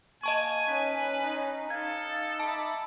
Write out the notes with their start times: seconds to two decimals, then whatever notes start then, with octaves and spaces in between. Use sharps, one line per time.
0.24 A#3 D#5 G#5 A5 C#6
0.68 C#4 D#4 B4
1.22 D#4
1.70 D#4 A4 F5 G#6
2.40 E5 A5 B5 D6